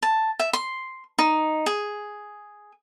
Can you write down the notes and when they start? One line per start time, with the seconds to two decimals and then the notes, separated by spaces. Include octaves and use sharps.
0.02 A5
0.39 E5
0.53 C6
1.18 D#4
1.66 G#4